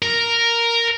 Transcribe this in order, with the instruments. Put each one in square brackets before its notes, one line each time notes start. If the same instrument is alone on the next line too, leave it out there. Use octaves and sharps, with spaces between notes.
[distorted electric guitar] A#4